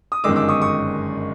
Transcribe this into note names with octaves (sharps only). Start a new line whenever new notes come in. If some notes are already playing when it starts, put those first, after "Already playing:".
D#6
G1 F#2 D#3 G#3 D6 E6
D6 E6
C#6 D#6
C#6 D#6